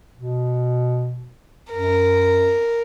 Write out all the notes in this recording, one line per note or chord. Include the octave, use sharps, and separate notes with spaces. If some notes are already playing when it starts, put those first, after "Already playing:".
B2
F#2 A#4